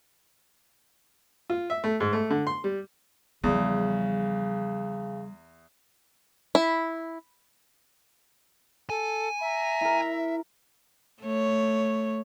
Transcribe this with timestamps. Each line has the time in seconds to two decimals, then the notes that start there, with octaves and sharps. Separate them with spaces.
1.50 F4
1.70 E5
1.84 A3
2.00 G#2
2.13 A3
2.30 D3
2.47 C6
2.64 G3
3.44 E2 C#3 F3 G3
6.55 E4
8.90 A4 G#5
9.41 E5 A#5
9.81 E4 A#4
11.22 A3 C#5